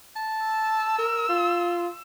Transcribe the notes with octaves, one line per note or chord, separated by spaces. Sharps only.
A5
E6
A#4
F4